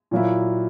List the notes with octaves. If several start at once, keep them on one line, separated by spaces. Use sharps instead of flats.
A#2 F#3 A#3 E4